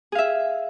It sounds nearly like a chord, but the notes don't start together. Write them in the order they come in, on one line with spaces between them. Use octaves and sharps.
G#4 F5 E5